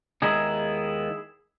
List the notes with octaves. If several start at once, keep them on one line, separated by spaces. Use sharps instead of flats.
D#2 D#3 G#3 B3 D#4 E4 G#4